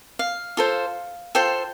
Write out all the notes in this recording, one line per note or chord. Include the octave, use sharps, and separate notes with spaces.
F5
F4 A4 C5
F4 A4 C5 G5